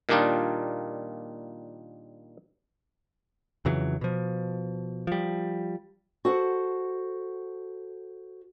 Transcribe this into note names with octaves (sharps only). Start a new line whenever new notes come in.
A#2 D#3 G3 D4 D#4 F4
F2 C#3 E3 F#3
B2 F3
F3 G3
F#4 A4 C5 F#5